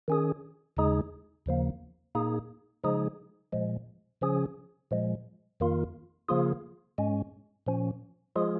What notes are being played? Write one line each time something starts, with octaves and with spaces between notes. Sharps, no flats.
D#3 C#4 G#4
D#2 C#3 G#3 D#4 G#4
D#2 C#3 F3 A#3
A#2 A#3 D#4 G#4
C#3 F3 G#3 D#4 G#4
A#2 F3 G#3
C#3 F3 C#4 G#4
A#2 F3 G#3
F2 D#3 A#3 F4
C#3 F3 A#3 F4 G#4
G#2 G#3 C#4
A#2 F3 C#4
F3 G#3 F4 G#4